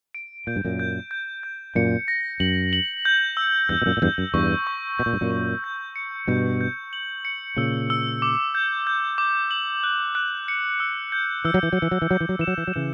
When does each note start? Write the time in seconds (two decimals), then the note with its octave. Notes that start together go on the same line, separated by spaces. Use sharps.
0.15 D7
0.47 A#2 G6
0.56 G2
0.65 F#2 A#2
0.79 G6
1.11 G6
1.43 G6
1.75 F#2 A#2 C#7
2.08 A#6
2.40 F#2 F#7
2.73 F#7
3.05 G6
3.37 E6
3.69 E2 G2 G6
3.82 B2
3.86 F#2 A#2
3.97 A#2
4.02 E2 G2 G6
4.18 F#2
4.34 E2 G2 C#6
4.67 C#6
4.98 B2 G6
5.06 A#2
5.13 G2
5.21 F#2 A#2
5.31 C#6
5.64 G6
5.96 C#7
6.27 G2 B2 G6
6.61 G6
6.93 F#7
7.25 C#7
7.57 A#2 C#3 E6
7.90 E6
8.22 D6
8.55 G6
8.87 G6
9.18 D6
9.51 F#7
9.84 F#6
10.15 F#6
10.48 C#7
10.80 E6
11.12 G6
11.45 E3 E6
11.54 F#3
11.63 E3
11.73 F#3
11.77 C#7
11.82 E3
11.91 F#3
12.02 E3
12.09 F#3 G6
12.20 E3
12.29 F#3
12.39 E3 E7
12.47 F#3
12.58 E3
12.67 F#3
12.74 C#3 E3 E7